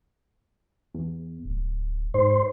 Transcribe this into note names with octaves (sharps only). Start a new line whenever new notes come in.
E2
D1
G#2 C5